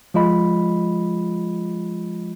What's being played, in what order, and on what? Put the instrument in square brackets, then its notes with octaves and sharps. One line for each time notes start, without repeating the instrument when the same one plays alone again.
[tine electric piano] F3 G#3 F4 D#5 B5